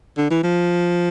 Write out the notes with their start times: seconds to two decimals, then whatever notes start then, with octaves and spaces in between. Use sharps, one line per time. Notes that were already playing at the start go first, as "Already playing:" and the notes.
0.17 D3
0.31 E3
0.43 F3